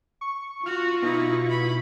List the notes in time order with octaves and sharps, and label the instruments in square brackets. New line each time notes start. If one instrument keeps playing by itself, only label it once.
[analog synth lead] C#6
[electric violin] F4 C#6 [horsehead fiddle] F#4 [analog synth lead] F6
[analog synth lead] B2 [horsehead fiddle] D#4 E4
[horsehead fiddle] E4 B5